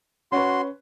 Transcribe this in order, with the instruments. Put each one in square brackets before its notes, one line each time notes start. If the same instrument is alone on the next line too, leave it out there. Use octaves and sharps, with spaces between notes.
[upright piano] C#4 B4 [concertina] F#4 C6